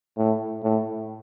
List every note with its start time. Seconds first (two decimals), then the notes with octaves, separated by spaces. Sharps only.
0.17 A2
0.63 A2